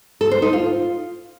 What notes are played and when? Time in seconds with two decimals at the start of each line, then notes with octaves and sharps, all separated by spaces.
0.21 A4
0.31 C5
0.42 D#4
0.53 F4